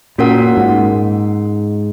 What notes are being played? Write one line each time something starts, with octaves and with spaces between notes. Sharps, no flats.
A#2 C#4 F#4 A#4 F#5
G#2